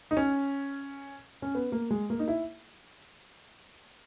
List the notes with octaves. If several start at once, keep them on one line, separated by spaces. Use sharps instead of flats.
D#4
C#4
C#4
B3
A#3
G#3
A#3
D#4
E4